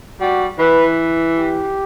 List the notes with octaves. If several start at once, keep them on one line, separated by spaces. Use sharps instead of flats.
G3 F#4
E3 B4
G4